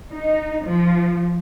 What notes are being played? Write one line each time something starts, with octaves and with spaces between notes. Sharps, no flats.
D#4
F3